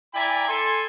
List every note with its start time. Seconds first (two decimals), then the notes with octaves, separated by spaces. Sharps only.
0.14 E4 D5 G5 G#5 A#5 B5
0.48 A4 G#5 C6